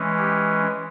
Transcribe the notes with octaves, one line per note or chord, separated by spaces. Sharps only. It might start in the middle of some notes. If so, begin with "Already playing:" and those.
Already playing: E3 G#3 C#4
G4